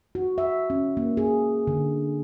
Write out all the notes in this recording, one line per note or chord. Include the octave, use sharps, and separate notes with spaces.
F#4
E5
C#4
A#3
G#4
D3